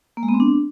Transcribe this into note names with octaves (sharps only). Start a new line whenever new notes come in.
A#3
G#3
B3
C4
D4